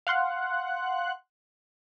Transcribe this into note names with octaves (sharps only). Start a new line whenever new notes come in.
F5 F#5 C6 F#6